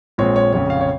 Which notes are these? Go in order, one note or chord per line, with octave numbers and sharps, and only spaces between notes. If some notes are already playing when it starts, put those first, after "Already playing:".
A#1 A#2 G#3 C4 C#5
C#5
F1 F2 C#3 C#5
F5
C#5